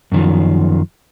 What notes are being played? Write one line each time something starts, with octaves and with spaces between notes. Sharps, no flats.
F#2 D#3 F3